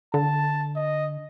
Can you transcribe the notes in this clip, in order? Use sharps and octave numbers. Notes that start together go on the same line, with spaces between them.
D3 A5
D#5